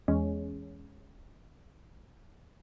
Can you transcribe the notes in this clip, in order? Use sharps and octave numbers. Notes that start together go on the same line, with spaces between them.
E2 G#3 C#4